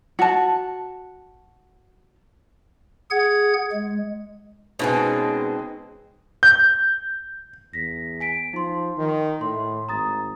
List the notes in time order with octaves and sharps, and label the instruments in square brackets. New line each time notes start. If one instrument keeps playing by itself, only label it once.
[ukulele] F#4 A5
[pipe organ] G#4 F#5 G#6
G#3
[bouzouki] B2 C4 C#4 [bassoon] G#3 [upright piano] D#4 B4 D#5
[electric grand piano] G6
[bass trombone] E2 [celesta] A#6 B6
[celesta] G#5 B6 D7
[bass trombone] F3 [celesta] D#4 C6
[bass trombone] D#3
[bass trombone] A2 [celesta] C6
[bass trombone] G#1 [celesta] A#5 D#6 A6